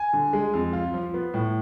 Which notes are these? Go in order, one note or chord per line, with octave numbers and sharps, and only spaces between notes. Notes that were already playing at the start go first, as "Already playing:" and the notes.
Already playing: G#5
D3
G#3
F2
F4
F3
B3
A2